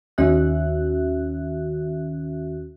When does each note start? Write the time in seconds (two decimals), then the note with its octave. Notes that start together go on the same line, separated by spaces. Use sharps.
0.18 D#2 D#3 C#4 F#4 E5 F#6